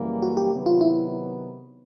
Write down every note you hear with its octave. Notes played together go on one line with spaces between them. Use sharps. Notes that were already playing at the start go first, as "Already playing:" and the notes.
Already playing: F#2 C#3 E3 G3 A#3
F#4
G4
C3 D#3 F#3 B3
F4
E4